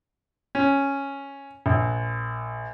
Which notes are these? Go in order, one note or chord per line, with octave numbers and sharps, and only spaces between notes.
C#4
A#1